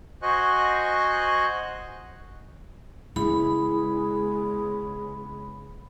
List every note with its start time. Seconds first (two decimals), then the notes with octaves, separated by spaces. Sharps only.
0.22 F#4 C5 D#5 G#5 C#6 F#6
3.16 C#3 G#3 B3 E4 G#4 B5